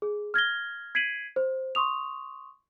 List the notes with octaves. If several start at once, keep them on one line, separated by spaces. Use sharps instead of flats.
G#4
F6 G#6 A#6 G7
G#6 B6 C7 D7 D#7 F#7
C5
C6 C#6 D#6 F7